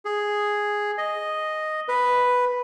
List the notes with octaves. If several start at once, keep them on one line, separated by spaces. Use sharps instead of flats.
G#4
D#5
B4